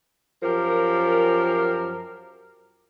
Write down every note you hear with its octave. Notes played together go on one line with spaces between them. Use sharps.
F#2 F3 G4 A#4